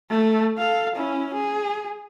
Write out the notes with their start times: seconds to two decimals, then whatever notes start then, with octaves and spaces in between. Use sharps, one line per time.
0.11 A3
0.58 A4 F5
0.96 C#4 E4
1.34 G#4